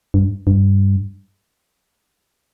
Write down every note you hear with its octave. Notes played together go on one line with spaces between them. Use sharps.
G2
G2